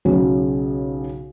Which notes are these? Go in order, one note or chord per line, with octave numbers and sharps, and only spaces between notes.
B1 C#3 F#4 G#4